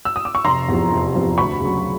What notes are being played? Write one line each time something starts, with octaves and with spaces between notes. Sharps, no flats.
E6
D#6
D6
C#6
F1 A#5 C6
E2 C3 F3
F1
E2 C3 F3
D2 B5 C#6
C#3 F#3